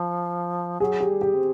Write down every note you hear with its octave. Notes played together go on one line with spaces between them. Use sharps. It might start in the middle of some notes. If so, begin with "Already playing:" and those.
Already playing: F3
F#3 G#4
G4
G3
G4
C4